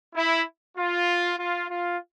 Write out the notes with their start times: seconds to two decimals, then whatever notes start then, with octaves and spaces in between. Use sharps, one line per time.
0.15 E4
0.77 F4
1.38 F4
1.69 F4